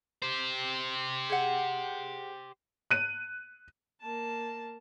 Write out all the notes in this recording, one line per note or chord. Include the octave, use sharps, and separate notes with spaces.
G4 C5
G#4 F#5
F#6 D#7
A#3 A5